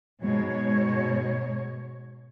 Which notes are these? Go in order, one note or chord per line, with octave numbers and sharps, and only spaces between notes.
G#2 B2 G#3 C#5